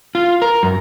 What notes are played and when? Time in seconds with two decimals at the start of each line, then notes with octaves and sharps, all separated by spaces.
0.15 F4
0.42 A#4
0.63 F#2